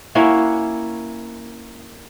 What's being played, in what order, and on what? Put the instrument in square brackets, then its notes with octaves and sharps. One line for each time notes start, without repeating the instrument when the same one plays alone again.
[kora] A#3 C#4 E4 F#4